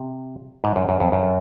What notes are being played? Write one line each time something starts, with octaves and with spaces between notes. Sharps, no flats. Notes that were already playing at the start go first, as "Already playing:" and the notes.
Already playing: C3
G#2
F#2
F#2
F2
F#2